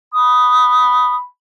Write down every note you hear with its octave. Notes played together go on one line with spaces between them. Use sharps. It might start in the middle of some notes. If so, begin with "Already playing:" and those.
B5 D#6